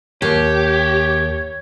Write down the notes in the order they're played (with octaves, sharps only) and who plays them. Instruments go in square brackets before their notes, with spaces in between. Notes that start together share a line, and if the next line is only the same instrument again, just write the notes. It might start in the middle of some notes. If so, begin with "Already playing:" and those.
[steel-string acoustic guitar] D#2 [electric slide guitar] G4 [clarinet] C#5